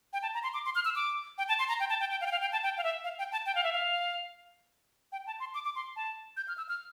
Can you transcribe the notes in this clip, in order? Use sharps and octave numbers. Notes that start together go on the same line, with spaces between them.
G5
A5
A#5
C6
D6
C6
F6
E6
D6
G5
A5
C6
A#5
G5
A5
G5
G5
F5
G5
F5
G5
A5
G5
F5
E5
F5
G5
A5
G5
F5
E5
F5
G5
A5
C6
D6
D6
C6
A5
G6
F6
E6
F6